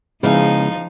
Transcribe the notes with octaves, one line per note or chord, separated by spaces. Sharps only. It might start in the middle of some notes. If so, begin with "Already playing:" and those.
C#3 F3 G#3 B3 D#4 E4 F5